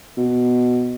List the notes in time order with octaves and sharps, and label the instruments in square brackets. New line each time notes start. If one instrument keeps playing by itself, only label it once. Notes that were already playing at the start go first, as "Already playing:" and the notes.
[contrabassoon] B2